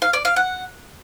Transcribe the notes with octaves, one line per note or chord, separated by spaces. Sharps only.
F5
D5
F5
F#5